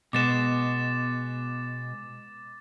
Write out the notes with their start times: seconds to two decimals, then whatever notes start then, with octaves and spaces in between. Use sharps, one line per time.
0.13 B2 G#3 B3 D6 A6 E7